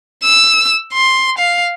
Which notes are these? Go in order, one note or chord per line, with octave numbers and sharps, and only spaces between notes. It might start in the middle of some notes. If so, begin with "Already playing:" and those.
E6
C6
F5